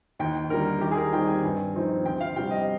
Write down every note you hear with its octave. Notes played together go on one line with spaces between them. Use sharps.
D#2 G5
D3 G3 A#4
D#2 G4
G#4
A#4
D#3 G3 C4 G5
G#5
G2
F3 C4 D#4
D2 G5
F5
C3 G3 G5
D#5